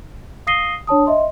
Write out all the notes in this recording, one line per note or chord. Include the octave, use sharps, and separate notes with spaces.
F5 D#6 A#6 C7 D#7 G7
D4 C#5 A5 D#6
D#5 E5 C6